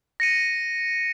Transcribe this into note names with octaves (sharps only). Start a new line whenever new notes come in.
A#6 C#7 D#7